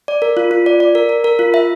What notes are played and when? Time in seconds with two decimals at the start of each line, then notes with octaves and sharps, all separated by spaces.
0.08 D5
0.22 A#4
0.37 F4
0.51 F4
0.66 D5
0.80 D5
0.95 A#4
1.09 A#4
1.24 A#4
1.39 F4
1.54 E5